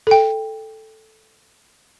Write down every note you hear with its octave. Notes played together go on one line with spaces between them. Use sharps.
A4 G5